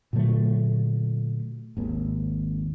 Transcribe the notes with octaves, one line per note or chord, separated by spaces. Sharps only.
A#2 D3 F#3 A3
G#1 D#2